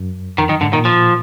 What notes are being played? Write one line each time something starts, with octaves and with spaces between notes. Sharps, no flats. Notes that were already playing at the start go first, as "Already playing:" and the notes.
Already playing: F#2
F2 D#3
F#2 D#3
G#2 D3
A#2 D#3
F3